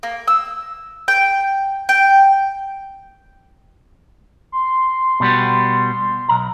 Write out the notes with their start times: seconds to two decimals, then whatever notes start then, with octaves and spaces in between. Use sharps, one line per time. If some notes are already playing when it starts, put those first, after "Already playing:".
0.03 A#3
0.28 E6
1.08 G5
1.89 G5
4.52 C6
5.20 B2 G3 B3
6.29 B1 A#5